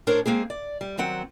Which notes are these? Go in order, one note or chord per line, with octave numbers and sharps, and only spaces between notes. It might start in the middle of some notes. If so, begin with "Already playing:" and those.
A2 D4 A#4 C5 C#5 A5
G#3 A#3 C4 G#4
D5
G3
D#3 F#3 C4 F#5